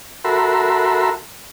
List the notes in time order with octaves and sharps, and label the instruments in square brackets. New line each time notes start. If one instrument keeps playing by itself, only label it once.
[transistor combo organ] F#4 A4 A#4 E5 B5 C6